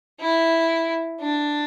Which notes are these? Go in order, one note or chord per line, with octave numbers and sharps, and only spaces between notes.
E4
D4